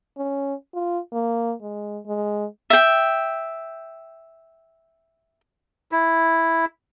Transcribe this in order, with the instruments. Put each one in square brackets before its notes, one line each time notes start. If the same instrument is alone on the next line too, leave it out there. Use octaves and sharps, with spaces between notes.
[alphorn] C#4
F4
A#3
G#3
G#3
[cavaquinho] E5 G5
[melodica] E4